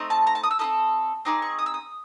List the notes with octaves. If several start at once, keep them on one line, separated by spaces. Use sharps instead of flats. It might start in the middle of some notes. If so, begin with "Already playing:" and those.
Already playing: A3 C4 D#4
A5
A#5
A5
D#6
E6
C4 E4 A4 D#6
C4 D#4 G#4 D6
C#6
D#6
E6
D#6